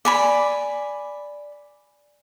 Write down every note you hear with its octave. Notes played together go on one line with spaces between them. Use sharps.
D5 G#5 B5